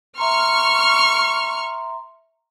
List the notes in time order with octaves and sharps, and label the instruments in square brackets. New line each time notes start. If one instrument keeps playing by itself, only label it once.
[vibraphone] E5 A#5 C6 [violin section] C#6 F6